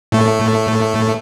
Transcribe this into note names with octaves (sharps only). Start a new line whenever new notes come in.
A2 A3